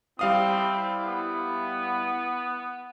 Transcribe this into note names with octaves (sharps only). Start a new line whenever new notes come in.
G3 C4 E4 F5 D#6
B3